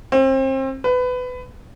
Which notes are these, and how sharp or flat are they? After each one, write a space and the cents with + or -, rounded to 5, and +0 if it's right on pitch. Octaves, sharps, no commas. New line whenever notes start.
C4 +30
B4 +20